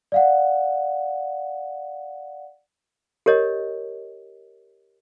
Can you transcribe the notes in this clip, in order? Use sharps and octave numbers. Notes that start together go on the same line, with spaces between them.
D5 F5 F#5
G4 A#4 C#5 D#5